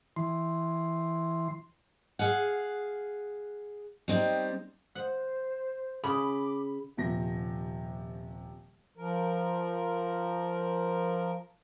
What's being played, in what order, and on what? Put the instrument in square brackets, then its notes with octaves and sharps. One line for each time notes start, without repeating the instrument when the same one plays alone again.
[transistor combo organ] E3 C6
[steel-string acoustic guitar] G#4 F5 F#5
G3 C4 D#4
[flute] C5 [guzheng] F#5
[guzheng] C#3 [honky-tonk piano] B5 [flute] D6
[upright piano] D#1 C3 F3 A#6
[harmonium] F3 A#4